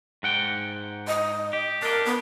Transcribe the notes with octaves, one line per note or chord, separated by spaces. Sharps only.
G#2 F#5 G5
D#5
G4
D4 G4 A#4
B3